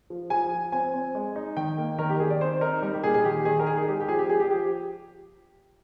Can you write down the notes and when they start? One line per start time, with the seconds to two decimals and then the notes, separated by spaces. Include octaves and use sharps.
0.10 F3
0.30 F3 G#5
0.52 F3
0.72 C4 G#5
0.94 C4
1.15 G#3
1.36 D#4
1.57 D#3 G5
1.78 A#3
1.99 D#3 A#4
2.09 G4
2.19 D#3 G#4
2.30 D5
2.40 C4 C5
2.61 D#4 A#4
2.82 G3 A#4
2.94 G4
3.03 A#2 G#4
3.14 G#4
3.25 D#3 G4
3.45 D#3 G#4
3.60 A#4
3.67 D#4 G#4
3.77 G#4
3.88 G#3 G4
4.01 G4
4.08 F3 G#4
4.19 G4
4.29 F3 G#4
4.40 G4
4.50 F3 G4